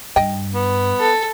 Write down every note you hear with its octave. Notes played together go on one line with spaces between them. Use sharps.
G2 D#5 G5
B3
A4